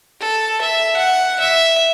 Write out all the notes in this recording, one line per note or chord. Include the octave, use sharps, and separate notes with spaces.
A4
E5
F#5
E5